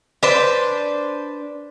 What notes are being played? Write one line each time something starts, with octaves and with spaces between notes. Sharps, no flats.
D4 B4 C5